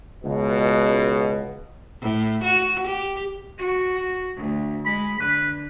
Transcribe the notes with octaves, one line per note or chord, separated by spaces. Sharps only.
C#2 B2
A2
F#4
G4
F#4
D2
G#3 B5
D3 B4